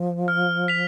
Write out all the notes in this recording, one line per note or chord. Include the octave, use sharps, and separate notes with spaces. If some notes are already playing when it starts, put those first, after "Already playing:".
Already playing: F3
F6
B6 F7